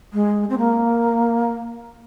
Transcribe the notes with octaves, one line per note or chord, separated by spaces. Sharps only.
G#3
C4
A#3